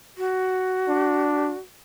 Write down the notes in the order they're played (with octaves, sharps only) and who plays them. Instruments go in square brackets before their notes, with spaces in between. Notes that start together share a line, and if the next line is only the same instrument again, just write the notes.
[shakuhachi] F#4
[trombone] D4